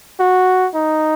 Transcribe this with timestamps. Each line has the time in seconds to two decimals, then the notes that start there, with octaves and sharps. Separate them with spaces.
0.20 F#4
0.74 D#4